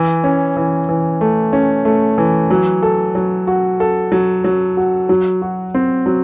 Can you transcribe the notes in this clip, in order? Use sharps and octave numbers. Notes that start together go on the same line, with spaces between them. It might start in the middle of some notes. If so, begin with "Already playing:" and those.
Already playing: E3
C#4
E3
E3
A3
C#4
A3
E3
F#3
A4
F#3
F#4
A4
F#3
F#3
F#4
F#3
F#4
C4
F#3